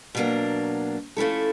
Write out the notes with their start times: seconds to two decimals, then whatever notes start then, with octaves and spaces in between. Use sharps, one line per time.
0.15 B2 F#3 A#3 D4
1.17 F3 A3 C#4 E4 A4